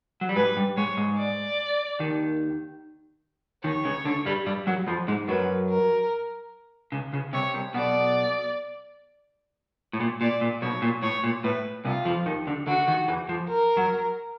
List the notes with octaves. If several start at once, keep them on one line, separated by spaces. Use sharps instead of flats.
F#3
G3
G#2 G#3 B4
G2 G3
G#2 G#3 C#5
G#2 G#3
D5
D#2 D#3
D#2 D#3 C#5
C#2 C#3
D2 D3
G2 G3
G2 G3
F#2 F#3
F2 F3
G#2 G#3
F#2 F#3 B4
A#4
C#2 C#3
C#2 C#3
C2 C3 C#5
C2 C3
B1 B2 D5
A2
A#2
A#2 D5
A#2
B1 B2 C#5
A#2
A2 C#5
A#2
A2 B4
C2 C3 F4
F2 F3
D#2 D#3
D2 D3
D2 D3 F#4
D#2 D#3
E2 E3
F2 F3
A#4
F#2 F#3